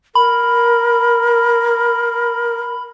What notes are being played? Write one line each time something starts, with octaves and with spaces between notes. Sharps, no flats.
A#4 B5